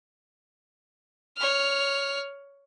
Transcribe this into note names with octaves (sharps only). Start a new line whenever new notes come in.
C#5 F6